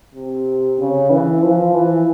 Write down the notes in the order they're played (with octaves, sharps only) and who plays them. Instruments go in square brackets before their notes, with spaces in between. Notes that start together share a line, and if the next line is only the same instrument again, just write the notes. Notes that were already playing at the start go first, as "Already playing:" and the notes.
[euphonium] C3
C#3
E3
F3
E3